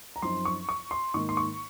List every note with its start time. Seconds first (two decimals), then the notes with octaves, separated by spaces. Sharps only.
0.16 A#5
0.22 F#2 F3 C4 D#4 C6
0.45 C#6
0.69 C#6
0.91 C6
1.14 G#2 D#3 A#3 D#4 C#6
1.29 C6
1.37 C#6